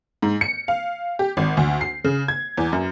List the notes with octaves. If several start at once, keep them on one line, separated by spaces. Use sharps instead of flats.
G#2
C#7
F5
G4
G#1
D2
C7
C#3
G#6
E2
F#2